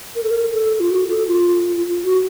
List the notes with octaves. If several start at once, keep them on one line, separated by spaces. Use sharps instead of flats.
A#4
A4
A#4
A4
F4
F#4
A4
F4
F#4